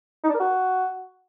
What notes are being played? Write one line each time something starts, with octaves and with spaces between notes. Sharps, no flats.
D#4
D4
A#4
F#4